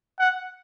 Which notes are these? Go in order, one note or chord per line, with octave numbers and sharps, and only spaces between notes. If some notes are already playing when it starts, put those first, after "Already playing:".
F#5